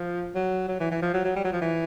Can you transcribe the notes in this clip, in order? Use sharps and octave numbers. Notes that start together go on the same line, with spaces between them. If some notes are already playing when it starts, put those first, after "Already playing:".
Already playing: F3
F#3
F#3
E3
E3
F3
F#3
F#3
G3
F#3
F3
E3